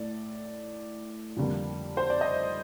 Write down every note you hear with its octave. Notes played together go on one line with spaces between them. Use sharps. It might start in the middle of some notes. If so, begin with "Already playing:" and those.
Already playing: A2 A3 D5
F2 D3 G3 A#3
C5
D5
D#5